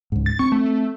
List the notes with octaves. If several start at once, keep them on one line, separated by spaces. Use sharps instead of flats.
C#2 G#2
A6
C4 C#6
A3